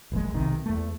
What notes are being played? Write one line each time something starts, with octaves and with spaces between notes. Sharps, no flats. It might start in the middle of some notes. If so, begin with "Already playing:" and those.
D#1 G#1 F3 G#3
B1 C3 D#3
E2 A3